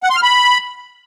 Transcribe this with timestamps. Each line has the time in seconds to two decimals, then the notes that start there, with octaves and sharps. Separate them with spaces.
0.03 F#5
0.10 C6
0.16 F6
0.23 B5